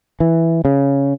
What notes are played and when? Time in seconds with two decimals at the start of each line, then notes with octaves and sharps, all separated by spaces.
0.20 E3
0.65 C#3